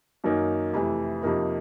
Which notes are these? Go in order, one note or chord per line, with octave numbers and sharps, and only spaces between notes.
F#2 D#3 F#3 A#3 D#4
F2 C3 E3 A3
F2 C3 F3 A#3 D#4